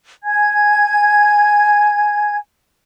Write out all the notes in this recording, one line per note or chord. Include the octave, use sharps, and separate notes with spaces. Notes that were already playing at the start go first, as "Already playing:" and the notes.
G#5 G#6